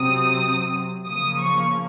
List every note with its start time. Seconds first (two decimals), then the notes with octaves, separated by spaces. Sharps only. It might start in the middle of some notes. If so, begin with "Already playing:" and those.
Already playing: C3 F#3 C4 D#6
1.06 C#3 F3 A#3 D#6
1.39 C#6